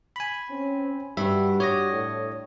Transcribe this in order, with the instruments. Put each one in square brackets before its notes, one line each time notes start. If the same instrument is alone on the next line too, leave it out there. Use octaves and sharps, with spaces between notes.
[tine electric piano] G#5 B5
[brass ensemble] C4 C#4
[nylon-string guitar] G2 [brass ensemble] F#4 G4 [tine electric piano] E5
[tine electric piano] C#5 D#6 A#6 [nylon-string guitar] D5
[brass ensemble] A2